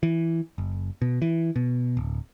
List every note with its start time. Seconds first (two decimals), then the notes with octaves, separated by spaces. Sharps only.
0.03 E3
0.58 F#1
1.02 B2
1.22 E3
1.56 B2
1.97 D1